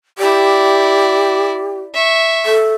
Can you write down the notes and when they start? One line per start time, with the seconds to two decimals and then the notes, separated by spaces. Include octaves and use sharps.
0.18 E4 G4 D5
1.94 E5 C#6
2.46 A4